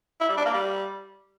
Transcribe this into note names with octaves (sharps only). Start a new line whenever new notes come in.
E4
G3
D4
A#3
G3